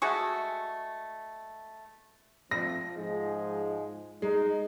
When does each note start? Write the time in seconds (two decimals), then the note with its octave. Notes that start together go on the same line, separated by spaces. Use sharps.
0.02 G#3 A3 F#4 G#4
2.51 F3 A3 C4 A#6
2.95 G#2 F3 G#3
4.22 G#3 D#4